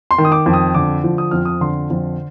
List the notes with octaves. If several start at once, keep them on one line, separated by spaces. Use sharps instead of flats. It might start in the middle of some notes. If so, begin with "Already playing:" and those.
C6
D#3
D#6
D6
F2
D#6
D3 D6
F3
D#6
F2 F6
D#6
D3 C6
F2